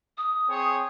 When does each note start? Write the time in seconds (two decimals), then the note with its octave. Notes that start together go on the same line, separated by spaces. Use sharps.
0.17 D#6
0.49 C4 G#4 C#5